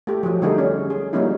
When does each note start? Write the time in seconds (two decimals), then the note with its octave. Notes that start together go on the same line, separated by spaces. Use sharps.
0.07 A3 G4
0.23 F3 F#3
0.42 D3 G3 A3 D#4 G#4
0.58 C#4
0.90 G#4
1.13 F#3 G3 A#3 C#4 D#4 E4